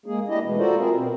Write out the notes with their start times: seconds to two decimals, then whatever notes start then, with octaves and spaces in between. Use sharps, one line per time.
0.06 G#3 A#3 G#4
0.28 D4 E4 G4 D#5
0.43 B2 E3 G#3 A3
0.58 F4 F#4 A4 A#4 C5 D5
0.78 C4 E4 G#4 A#4
0.95 B2 C4